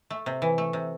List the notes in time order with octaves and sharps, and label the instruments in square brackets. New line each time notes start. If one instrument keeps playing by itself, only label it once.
[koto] A3
C3
E3
A3
C3